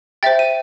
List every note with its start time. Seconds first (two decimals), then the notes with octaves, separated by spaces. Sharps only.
0.23 C5 E5 G5 A6
0.39 D#7